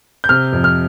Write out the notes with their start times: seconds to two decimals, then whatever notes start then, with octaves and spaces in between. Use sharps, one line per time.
0.24 G6
0.29 C3 F6
0.53 F2
0.64 F6